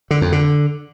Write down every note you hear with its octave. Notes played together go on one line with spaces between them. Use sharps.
D3
F2
D3